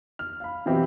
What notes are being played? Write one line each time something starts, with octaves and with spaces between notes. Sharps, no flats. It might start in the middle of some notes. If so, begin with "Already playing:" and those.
F6
F5 B5
B2 E3 F#3 C4 E4 G4